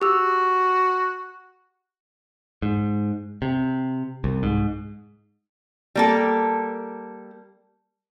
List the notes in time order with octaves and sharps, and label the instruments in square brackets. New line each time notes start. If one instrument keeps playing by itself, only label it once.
[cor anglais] F#4 [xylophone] G4 E6
[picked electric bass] G#2
C3
C2
G#2
[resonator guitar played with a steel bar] G3 A#3 A4